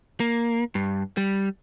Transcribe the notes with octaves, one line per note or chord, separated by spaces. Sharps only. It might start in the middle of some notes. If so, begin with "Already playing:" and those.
A#3
G2
G3